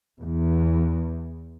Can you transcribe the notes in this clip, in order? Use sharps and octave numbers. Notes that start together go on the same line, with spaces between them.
E2